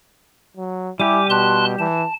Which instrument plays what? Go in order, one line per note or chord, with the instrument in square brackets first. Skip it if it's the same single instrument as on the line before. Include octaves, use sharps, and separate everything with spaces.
[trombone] F#3
[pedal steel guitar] G3 G4 [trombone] E4 [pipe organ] G#5 D6
[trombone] B2 [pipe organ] A5 C6 F#6
[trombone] E3 [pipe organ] A5